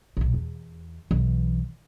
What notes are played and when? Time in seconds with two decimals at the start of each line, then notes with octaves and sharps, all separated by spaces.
0.17 B1 A#2
0.34 E2
1.11 B1 E3